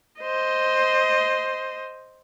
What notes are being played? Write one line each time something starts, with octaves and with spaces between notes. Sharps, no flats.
C5 D#5